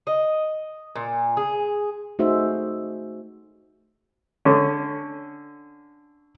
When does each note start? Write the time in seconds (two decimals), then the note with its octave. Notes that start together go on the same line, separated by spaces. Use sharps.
0.07 D#5
0.95 A#2
1.37 G#4
2.19 A3 D#4 F#4 G#4 C5 E5
4.45 D3 C#4